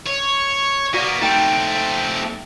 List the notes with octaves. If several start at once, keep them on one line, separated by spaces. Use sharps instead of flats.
C#5
A#3 B3 F#4 D5
A3 C4 D#4 G5 D7